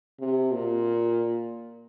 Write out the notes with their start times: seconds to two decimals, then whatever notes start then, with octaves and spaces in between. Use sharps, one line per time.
0.19 C3
0.53 A#2